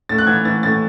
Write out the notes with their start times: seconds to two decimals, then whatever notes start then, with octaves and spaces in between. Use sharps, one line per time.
0.09 A2 A6
0.18 F#6
0.27 E3 G#6
0.45 E3 A6
0.63 A2 A6